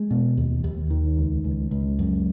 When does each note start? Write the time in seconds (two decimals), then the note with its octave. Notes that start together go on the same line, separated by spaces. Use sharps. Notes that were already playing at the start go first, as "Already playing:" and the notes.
Already playing: G#3
0.11 B2
0.37 D#2
0.64 D#2
0.90 D#3
1.18 C#2
1.44 C#2
1.71 C#2
1.99 F#2